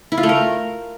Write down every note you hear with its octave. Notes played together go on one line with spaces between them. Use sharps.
E4
F4
A3
A#4